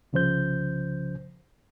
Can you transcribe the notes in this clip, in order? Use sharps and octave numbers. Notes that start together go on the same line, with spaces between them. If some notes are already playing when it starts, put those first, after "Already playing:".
C2 C#3 F3 C5 G6